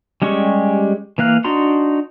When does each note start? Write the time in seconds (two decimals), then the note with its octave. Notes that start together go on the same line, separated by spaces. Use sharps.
0.22 G3 G#3 C#4 G4 C#6
1.18 E3 A#3 F5 F#6
1.44 D4 D#4 F#4 A#5 C6